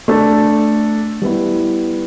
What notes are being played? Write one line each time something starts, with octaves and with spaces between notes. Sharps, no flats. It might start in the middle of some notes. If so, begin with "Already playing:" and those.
A3 D4 A4
G3 B3 E4